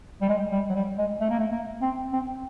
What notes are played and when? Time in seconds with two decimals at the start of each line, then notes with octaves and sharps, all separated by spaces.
0.21 G3
0.29 G#3
0.52 G3
0.69 F#3
0.75 G3
0.98 G#3
1.20 A3
1.29 A#3
1.39 A3
1.51 A#3
1.82 C4
2.13 C4